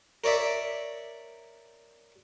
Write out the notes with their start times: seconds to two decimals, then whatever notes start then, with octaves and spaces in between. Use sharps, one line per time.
0.24 A#4 C#5 D5 E5